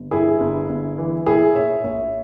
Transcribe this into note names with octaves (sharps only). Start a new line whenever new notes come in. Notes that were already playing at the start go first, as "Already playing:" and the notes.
Already playing: G1
G2 E4 G#4
G1
G1
E3
A#2 E4 G#4
A#2 C#5 E5
A#1 C#5 E5